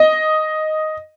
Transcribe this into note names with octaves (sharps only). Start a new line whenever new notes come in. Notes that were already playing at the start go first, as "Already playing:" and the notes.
Already playing: D#5